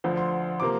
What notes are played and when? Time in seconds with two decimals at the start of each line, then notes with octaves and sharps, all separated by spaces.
0.04 D2 D3 F3
0.17 C6
0.60 C3 F3 A#3 D6